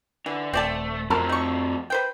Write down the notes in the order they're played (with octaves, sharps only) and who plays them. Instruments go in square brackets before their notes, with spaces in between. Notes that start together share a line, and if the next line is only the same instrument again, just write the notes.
[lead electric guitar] D3 [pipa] E3
[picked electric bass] D#1 [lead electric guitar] A3 [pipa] C4 D5 A5
[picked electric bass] F2 [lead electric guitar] A2 C4 [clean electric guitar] A4 [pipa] A#4
[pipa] D#4 C#6
B4 C5 G5